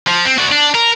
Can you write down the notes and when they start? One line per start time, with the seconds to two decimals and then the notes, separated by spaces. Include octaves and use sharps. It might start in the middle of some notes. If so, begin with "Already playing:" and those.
0.07 F3
0.25 C4
0.38 D4 F#4
0.52 D4
0.75 A#4